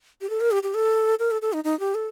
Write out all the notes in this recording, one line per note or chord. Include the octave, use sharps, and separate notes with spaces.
G4
A4
A#4
G4
G4
A4
A#4
A4
A4
D#4
D#4
G4
A4